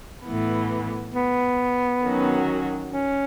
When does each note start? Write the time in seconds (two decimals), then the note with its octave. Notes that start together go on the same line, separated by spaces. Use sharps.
0.24 A2 E3 B3
1.14 B3
2.04 D#3 F#3 C#4 F#4
2.92 C#4